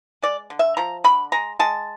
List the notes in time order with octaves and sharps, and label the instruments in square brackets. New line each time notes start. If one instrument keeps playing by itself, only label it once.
[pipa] G#3 D5
D3
E5
F3 A#5
D3 B5
G#3 A#5
G#3 A5